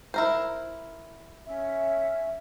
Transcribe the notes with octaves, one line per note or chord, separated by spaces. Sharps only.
E4 A#4 C5
C#4 E5